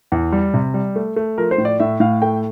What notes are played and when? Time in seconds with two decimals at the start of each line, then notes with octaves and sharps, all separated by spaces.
0.12 E2
0.32 G3
0.54 C3
0.74 G3
0.96 A3
1.16 A3
1.38 F3 A#4
1.51 C5
1.58 A2
1.65 D5
1.80 A2 E5
2.00 A2 F5
2.22 A3 G5